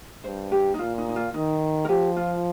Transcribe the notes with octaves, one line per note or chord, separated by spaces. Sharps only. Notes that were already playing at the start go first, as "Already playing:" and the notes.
G2 C5
G4
D#4
A#2 F4
D#4
D#4
F4
D#3 D#4
A#4
F3 G4
F4